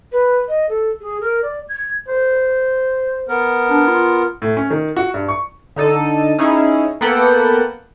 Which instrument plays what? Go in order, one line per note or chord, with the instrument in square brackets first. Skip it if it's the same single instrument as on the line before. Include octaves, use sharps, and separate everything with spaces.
[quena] B4
D#5
A4
G#4
A#4
D5
G#6
[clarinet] C5
[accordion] B3 A#4
[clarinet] D4
F4
[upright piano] A2
C#4
D#3
F#4
G2
C#6
[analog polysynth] D3 D#4 A4 D#7
C#4 D#4 E4 G#4
A#3 B3 A4 B4 F#5 G5